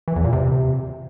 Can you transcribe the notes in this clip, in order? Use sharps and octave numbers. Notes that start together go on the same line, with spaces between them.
E3
E2
A#2
C3